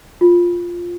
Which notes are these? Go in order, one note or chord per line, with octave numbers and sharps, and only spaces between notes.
F4